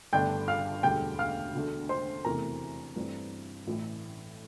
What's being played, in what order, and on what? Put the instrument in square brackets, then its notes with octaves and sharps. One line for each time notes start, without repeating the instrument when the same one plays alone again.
[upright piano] G1 G2 D3 A3 D4 G5 G6
F5 F6
E1 D2 D3 G3 G5 G6
F5 F6
E1 D2 D3 A3
C5 C6
F1 E2 C3 E3 A3 A#4 A#5
G2 E3 A3 C4
A1 A2 E3 A3